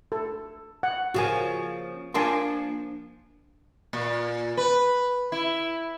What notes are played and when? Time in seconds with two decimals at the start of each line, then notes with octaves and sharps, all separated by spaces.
0.12 A4
0.83 F#5
1.14 C#3 F3 A#3 F#4 G#5
2.14 F3 A#3 D4 G#5 A5 C6
3.93 A#2
4.57 B4
5.32 E4